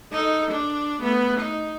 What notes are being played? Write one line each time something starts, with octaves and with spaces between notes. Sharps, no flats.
D#4 A4
D4
A3 B3
D#4